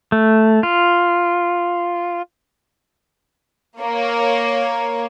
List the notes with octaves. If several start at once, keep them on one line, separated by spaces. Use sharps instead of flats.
A3
F4
A#3 C#5